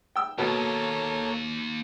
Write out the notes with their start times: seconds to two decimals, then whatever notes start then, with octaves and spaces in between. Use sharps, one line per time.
0.16 G5 E6
0.38 D#2 B2 A#3 A4 C#5